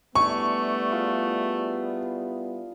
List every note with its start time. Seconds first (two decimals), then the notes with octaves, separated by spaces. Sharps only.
0.15 G3 A3 B3 D4 E4 G#5 C#6
0.92 F4 G#4